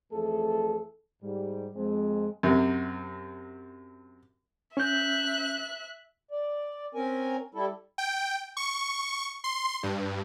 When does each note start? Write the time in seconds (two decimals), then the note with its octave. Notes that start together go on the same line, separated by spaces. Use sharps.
0.12 F2 E3 A3 G#4 A4
1.23 G#2 G3
1.76 F2 G#3 C4
2.43 F#2 C3
4.77 C#4 E5 F#6 G6
6.31 D5
6.95 C4 C#4 A#4 G#5
7.55 G3 E4 A4
7.98 G5
8.57 C#6
9.44 C6
9.83 G2